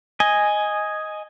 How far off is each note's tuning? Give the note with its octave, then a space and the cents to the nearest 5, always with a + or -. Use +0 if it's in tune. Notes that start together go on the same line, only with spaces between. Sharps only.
D#5 +0 G#5 +0